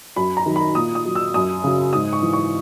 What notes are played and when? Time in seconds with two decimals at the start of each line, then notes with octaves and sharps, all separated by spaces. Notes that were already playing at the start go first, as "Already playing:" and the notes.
0.16 F#2 B5
0.37 A#5
0.46 D#3 F#3
0.56 B5
0.75 A#2 D#6
0.95 D#6
1.05 F#3
1.15 E6
1.34 F#2 D#6
1.64 C#3 F#3
1.93 G#2 D#6
2.13 C#6
2.22 E3
2.33 C#6